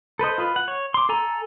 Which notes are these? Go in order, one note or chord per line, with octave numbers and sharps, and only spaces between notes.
A4 B4 C5 D#5
F4 B4
F#5
C#5
C6 D6
A4 G#5 A#5